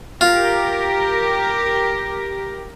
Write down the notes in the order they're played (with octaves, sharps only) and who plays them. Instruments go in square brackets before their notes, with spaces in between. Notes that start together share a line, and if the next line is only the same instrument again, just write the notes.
[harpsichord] F4 [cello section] G4 A#4